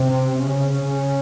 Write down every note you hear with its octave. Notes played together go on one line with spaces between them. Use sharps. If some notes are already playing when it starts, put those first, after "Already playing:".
Already playing: C3 C4
C#3 C#4